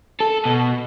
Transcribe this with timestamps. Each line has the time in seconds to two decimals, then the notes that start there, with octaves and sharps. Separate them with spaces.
0.20 A4
0.46 B2